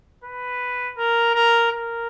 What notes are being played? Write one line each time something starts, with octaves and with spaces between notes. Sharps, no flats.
B4
A#4
A#4
A#4